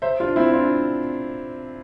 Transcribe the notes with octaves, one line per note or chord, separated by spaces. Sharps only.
C5 E5
D4 F4
C4 E4
D4 F4